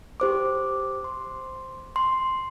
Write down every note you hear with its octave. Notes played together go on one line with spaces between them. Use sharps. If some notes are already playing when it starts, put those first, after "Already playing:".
G4 C5 D6
C6
C6